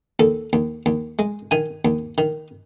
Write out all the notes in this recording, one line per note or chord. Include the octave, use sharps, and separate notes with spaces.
D#2 A4
D#2
D#2
G#3
D#3 G#5
D#2
D#3